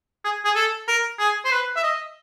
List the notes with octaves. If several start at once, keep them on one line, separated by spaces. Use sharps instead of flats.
G#4
G#4
A4
A#4
G#4
C5
B4
E5
D#5